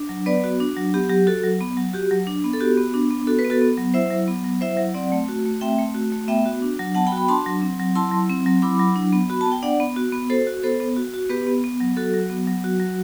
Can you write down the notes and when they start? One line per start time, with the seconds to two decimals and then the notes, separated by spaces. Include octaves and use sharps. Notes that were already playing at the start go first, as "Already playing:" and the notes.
Already playing: D4
0.09 F#3
0.26 B3 B4 D5
0.44 F#4
0.60 D4
0.77 F#3
0.94 B3 G4
1.09 F#3 G4
1.27 F#4 A4
1.43 F#3
1.60 B3
1.77 F#3
1.93 F#4 G4
2.11 F#3
2.27 D4
2.44 B3
2.53 A4
2.60 F#4 G4
2.77 B3
2.94 D4
3.11 B3
3.27 F#4 A4
3.39 B4
3.45 B3
3.50 F#4 A4
3.61 B3
3.77 F#3
3.94 E4 C5 E5
4.11 F#3
4.28 B3
4.45 F#3
4.61 E4 C5 E5
4.77 F#3
4.94 C4 D5 F#5
5.12 A3
5.28 F#4
5.45 A3
5.61 C4 E5 G5
5.78 A3
5.94 F#4
6.12 A3
6.28 B3 E5 G5
6.46 F#4
6.62 D4
6.79 F#3
6.95 B3 F#5 A5
7.07 G5 B5
7.12 F#4
7.17 G5 B5
7.28 D4 A5 C6
7.46 F#3
7.62 C4
7.79 F#3
7.95 E4 A5 C6
8.12 F#3
8.30 C4
8.46 F#3
8.62 E4 B5 D6
8.79 F#3
8.96 D4
9.12 B3
9.30 F#4 B5
9.41 A5
9.46 B3
9.52 G5
9.63 D4 D5 F#5
9.80 B3
9.96 F#4
10.12 B3
10.30 F#4 A4 C5
10.47 F#4
10.63 B3 A4 C5
10.80 B3
10.97 F#4
11.14 F#4
11.29 B3 G4 B4
11.47 B3
11.64 B3
11.80 F#3
11.97 F#4 A4
12.14 F#3
12.30 B3
12.47 F#3
12.64 F#4
12.80 F#3